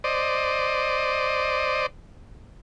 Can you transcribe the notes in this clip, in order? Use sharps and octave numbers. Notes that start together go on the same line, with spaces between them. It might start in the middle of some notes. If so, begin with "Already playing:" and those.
C5 D5 D#5